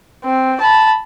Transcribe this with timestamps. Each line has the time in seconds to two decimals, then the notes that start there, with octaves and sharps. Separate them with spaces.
0.24 C4
0.60 A5 B5